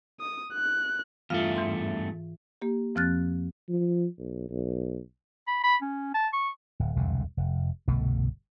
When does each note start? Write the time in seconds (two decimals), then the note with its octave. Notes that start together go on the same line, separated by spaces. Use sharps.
0.20 D#6
0.54 F#6
1.30 E2 G2 A3 F4 F5
1.56 G#2 E3 C6
2.62 A#3 G4
2.95 F2 F3 C4 F6 F#6 A6
3.69 F3
4.18 B1
4.49 B1
5.48 B5
5.64 B5
5.82 C#4
6.14 A5
6.33 C#6
6.79 D1
6.96 E1 C2 F2 D3
7.37 F1
7.88 G1 C2 B2 A3